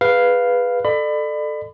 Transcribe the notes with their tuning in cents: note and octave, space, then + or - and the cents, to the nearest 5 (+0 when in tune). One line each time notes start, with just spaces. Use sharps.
G#4 -15 B4 +0 F5 +0
A4 +0 D5 +35 B5 +25